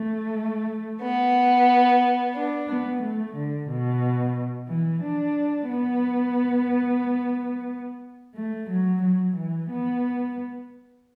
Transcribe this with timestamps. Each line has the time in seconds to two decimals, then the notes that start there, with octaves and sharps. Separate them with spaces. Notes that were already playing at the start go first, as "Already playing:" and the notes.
Already playing: A3
1.02 B3
2.35 D4
2.69 B3
3.02 A3
3.35 D3
3.70 B2
4.69 E3
5.03 D4
5.69 B3
8.36 A3
8.70 F#3
9.03 F#3
9.36 E3
9.70 B3